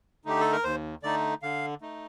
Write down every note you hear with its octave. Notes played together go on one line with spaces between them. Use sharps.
D3 A3 D#4 G4
A4
A#4
D#2 C5
D3 A3 D#4 D5
D3 F5
A3 D#4